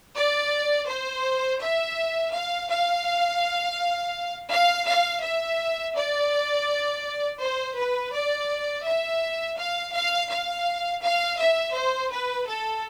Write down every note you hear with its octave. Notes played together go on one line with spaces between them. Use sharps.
D5
C5
E5
F5
F5
F5
F5
E5
D5
C5
B4
D5
E5
F5
F5
F5
F5
E5
C5
B4
A4